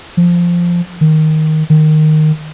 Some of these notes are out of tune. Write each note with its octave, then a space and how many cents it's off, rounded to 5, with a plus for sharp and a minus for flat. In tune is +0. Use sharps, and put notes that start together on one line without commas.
F3 -5
D#3 +5
D#3 -10